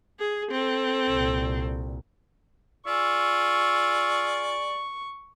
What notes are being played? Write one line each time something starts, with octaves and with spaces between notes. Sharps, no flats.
G#4
C4 A4
C2 A#2
F4 G#4 D5 C#6 E6